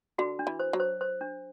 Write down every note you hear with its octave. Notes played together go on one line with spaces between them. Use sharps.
D3 F#4
D4
E3
C5
F#3
C5
C5
D4